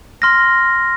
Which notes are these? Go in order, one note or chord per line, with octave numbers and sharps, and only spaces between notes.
C6 F6 A#6